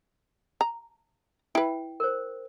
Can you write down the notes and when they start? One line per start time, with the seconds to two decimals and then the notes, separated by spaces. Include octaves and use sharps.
0.61 A#5
1.55 E4 B4 G5
2.00 A#4 C5